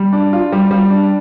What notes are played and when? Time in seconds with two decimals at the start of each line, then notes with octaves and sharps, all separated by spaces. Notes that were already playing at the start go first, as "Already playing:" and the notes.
Already playing: G3
0.13 D4
0.33 F4
0.52 G3
0.71 G3
0.90 D4